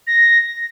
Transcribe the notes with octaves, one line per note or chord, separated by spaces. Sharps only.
A#6